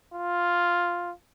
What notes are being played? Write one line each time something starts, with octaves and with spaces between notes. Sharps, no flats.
F4